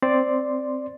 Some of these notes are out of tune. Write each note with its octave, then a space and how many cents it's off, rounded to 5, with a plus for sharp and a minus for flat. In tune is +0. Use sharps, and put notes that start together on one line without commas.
C4 +0 D5 +0 C6 +0